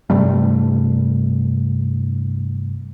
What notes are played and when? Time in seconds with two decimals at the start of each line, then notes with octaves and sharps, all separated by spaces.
0.10 G2 C3 G3 A3